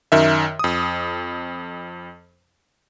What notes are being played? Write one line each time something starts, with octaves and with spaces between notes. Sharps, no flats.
F#2 D#3 E5
F2 D#6